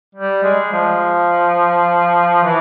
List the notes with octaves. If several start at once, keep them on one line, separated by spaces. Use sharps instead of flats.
G3
G#3
F3
E3